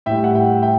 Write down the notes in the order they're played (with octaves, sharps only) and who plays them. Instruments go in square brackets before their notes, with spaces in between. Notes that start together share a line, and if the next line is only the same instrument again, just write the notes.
[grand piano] A2 E5 G5
G3
F#5
E5 G5
E5 G5